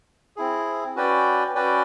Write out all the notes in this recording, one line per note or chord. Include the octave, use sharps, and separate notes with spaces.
C4 E4 G#4
C#4 F#4 B4 D5 G5
C#4 F#4 B4 D5 G5